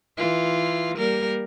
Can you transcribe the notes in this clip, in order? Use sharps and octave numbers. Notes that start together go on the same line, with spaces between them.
E3 F4
G3 A#3 A#4